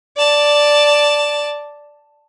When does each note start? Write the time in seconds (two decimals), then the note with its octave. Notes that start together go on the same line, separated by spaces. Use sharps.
0.17 D5 A5